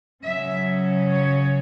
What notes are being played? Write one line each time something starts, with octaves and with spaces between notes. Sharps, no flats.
C#3 F#3 C#4 E5
C#5